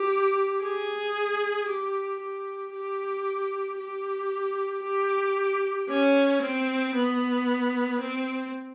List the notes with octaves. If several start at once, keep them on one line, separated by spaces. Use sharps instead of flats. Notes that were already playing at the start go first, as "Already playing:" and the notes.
Already playing: G4
G#4
G4
G4
G4
G4
G4
C#4
C4
B3
C4